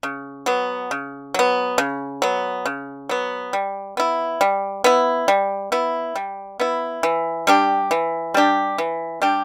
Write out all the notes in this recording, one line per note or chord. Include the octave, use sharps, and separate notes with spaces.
C#3
F#3 B3
C#3
F#3 B3
C#3
F#3 B3
C#3
F#3 B3
G3
B3 E4
G3
B3 E4
G3
B3 E4
G3
B3 E4
E3
G3 D4 G4
E3
G3 D4 G4
E3
G3 D4 G4